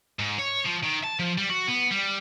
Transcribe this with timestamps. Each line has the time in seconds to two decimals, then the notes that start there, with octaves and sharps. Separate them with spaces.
0.19 G#2
0.38 C#5
0.65 F3
0.83 D#3
1.04 A5
1.19 F3
1.38 G3
1.50 F#4
1.68 B3
1.91 G3